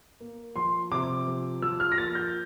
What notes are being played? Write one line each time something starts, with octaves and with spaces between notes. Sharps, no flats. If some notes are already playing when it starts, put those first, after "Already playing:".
A#3
F3 C6
C3 D6
F3
F3 E6
F6
A#6
A#3 A6
G6